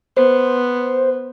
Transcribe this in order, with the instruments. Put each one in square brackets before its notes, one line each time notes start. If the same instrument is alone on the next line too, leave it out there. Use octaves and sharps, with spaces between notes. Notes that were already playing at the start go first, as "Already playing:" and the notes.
[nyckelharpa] B3 [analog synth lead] C5